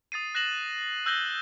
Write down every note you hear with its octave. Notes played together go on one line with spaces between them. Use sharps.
D#6 A6 C7 D#7
F#6 A#6 E7 F#7
E6 F#6 G6 A#6 F#7 G7